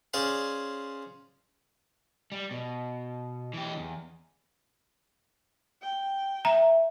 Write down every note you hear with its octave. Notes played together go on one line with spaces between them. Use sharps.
C#4 G#4 C5 D5 F5 C6
G3
B2
E3 G4
E2
G5
E5 A#5